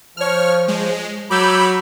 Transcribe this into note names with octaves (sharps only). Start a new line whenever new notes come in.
F3 C#5 F6
G#3
F#3 B5 D6 E6 G6